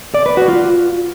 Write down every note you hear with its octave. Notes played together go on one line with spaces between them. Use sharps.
D5
B4
F#4
F4